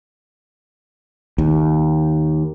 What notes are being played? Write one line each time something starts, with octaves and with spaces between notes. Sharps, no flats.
D#2